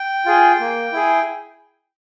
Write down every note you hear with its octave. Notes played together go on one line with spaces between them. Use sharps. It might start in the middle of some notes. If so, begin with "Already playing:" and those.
Already playing: G5
F4 G#4
A#3
E4 G#4